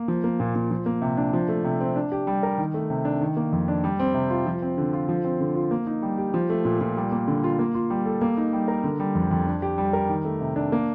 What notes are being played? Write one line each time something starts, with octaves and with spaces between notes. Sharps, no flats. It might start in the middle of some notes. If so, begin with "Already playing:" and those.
Already playing: A#3
F3
A#3
A#2
A#2
F3
A#3
C3
D4
F3
A3
C3
C4
D4
G4
G3
A#4
D#3
A3
C3
D4
D#3
A#3
F2
D4
G3
C4
C3
F4
F3
C4
D3
F4
F3
C4
D3
F4
A#3
D#4
G3
G4
F3
A3
A#2
A#2
G3
A#3
D3
F4
A#3
F4
G3
A4
A#3
D#4
G3
A#4
D3
G3
F2
F2
D4
G4
G3
A#4
D#3
A3
C3
D4
A#3